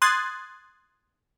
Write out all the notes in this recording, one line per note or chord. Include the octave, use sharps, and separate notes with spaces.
C6 D#6 F#6 G#6 A6